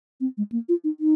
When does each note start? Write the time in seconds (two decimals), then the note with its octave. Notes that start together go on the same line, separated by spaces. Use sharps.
0.21 C4
0.37 G#3
0.52 A#3
0.69 F4
0.84 D#4
1.00 D#4